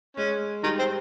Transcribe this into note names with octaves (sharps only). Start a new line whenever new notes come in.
G#3 C#4
D#3 G3 D#4
C4 C5